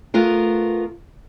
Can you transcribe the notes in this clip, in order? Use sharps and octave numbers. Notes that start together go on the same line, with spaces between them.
A3 B3 F4 A#4